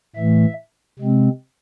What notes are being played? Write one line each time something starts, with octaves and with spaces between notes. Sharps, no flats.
A2 E3 A3 E5
C3 G#3 C4